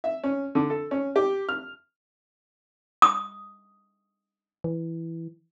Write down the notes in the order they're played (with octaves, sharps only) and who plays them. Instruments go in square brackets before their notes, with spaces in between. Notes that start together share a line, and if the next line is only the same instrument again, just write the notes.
[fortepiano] E5
C#4
D3
A4
C#4
G4
F6
[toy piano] D#6
[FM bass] E3